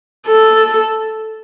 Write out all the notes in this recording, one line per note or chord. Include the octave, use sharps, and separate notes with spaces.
A4